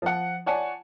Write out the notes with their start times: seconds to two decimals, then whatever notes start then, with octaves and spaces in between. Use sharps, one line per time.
0.02 F3 F#5
0.46 C#5 D5 F#5 G#5 A5